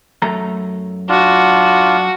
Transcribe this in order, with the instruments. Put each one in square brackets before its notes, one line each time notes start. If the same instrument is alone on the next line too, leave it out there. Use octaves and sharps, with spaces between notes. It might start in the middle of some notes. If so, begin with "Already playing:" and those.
[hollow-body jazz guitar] F#2 A3 A#5
[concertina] D4 F4 [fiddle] F#4